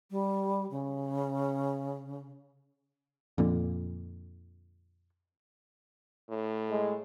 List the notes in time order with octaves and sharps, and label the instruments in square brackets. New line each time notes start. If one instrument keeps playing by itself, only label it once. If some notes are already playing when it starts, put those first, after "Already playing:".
[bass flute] G3
C#3
[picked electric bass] F2 A#2 D3
[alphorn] A2
[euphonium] G#3